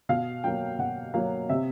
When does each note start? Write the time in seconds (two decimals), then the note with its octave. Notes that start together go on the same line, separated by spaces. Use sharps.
0.09 B2 F5
0.44 F#3 A#3 G5
0.79 B2 F#5
1.14 F#3 A#3 F5
1.49 C3 E5